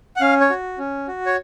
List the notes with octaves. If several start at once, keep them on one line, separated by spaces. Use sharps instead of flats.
F#5
C#4 F5
C#5
F#4
C#4
F#4
C#5